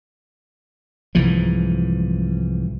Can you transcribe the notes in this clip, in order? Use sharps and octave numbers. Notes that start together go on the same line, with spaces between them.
C2 G#2 E3 F3